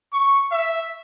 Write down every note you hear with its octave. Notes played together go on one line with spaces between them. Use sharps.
C#6
E5